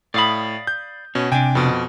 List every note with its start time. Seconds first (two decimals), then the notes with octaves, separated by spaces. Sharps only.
0.14 A2 D5 F5 B5 D#6
0.67 G6
1.15 B2 C#4
1.32 C3 D4 G5 G#5
1.55 F2 B2